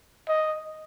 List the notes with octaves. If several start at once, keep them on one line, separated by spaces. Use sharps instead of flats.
D#5